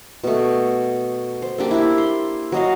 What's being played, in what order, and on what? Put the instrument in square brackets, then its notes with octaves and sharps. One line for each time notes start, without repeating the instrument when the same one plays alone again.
[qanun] B2 A3
C5
A#3 D4 G4
E4 G4
C6
F#3 D#5 F5